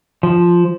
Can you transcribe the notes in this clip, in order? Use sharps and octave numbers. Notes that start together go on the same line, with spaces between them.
F3